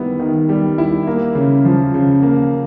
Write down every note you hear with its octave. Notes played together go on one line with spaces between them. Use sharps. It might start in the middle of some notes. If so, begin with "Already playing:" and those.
Already playing: D#3 G3 B3 E4
D#3
G3
E4
A#3
C#3
F3
C#3
A#3